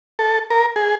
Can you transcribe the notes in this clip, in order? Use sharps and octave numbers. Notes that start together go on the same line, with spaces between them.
A4
A#4
G#4